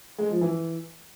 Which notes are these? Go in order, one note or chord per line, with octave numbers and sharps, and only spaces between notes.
G#3
F3
E3